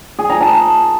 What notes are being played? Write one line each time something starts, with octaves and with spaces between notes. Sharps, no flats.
G#4
A#5
A5